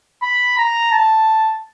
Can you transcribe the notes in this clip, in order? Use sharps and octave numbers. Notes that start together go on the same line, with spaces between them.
B5
A#5
A5